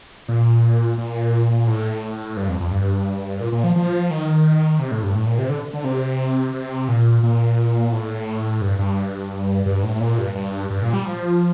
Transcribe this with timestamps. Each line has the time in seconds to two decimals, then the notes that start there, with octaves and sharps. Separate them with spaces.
0.28 A#2
0.98 A#2
1.67 A2
2.37 G2
2.48 F2
2.60 F2
2.72 G2
3.41 A#2
3.52 A#2
3.64 F3
3.76 F3
4.10 D#3
4.79 C3
4.91 A2
5.03 G2
5.15 A2
5.26 A#2
5.38 C3
5.49 D3
5.73 D3
5.84 C3
6.54 C3
6.88 A#2
7.23 A#2
7.92 A2
8.61 G2
8.79 G2
9.66 G2
9.83 A2
10.01 A#2
10.18 G2
10.35 G2
10.70 G2
10.82 A#2
10.93 G3
11.05 F3